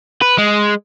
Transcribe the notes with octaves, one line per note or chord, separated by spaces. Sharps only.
B4
G#3